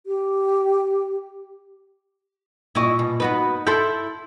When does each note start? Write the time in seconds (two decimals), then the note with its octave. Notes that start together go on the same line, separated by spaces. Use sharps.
0.06 G4
2.75 A#2 E4 D#5 C#6
2.99 B2
3.20 B3 D#4 F#4 B4
3.67 E4 A4 C6 G6